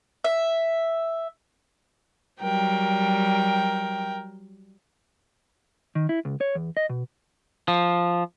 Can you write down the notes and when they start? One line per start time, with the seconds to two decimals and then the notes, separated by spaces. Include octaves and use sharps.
0.24 E5
2.41 F#3 G3 A#4 G5
5.95 D#3
6.09 E4
6.25 C#2
6.41 C#5
6.55 E2
6.77 D#5
6.90 B2
7.68 F3